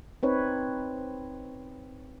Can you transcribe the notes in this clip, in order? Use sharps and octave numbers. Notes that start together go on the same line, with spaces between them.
C4 D#4 B4 C#5